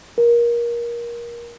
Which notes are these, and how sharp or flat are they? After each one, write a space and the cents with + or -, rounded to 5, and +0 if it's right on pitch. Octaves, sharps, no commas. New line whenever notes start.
A#4 +20